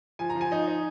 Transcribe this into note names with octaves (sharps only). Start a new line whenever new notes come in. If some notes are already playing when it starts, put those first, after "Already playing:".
F3 G#5
A#5
F3
G#5
D#4
D#4